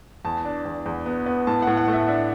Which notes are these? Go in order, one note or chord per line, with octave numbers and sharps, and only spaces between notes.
E2 A5
D4
E2
E2
B3
B3
A2 A5
A2 F#5
F#5
A3
E5
D4 E5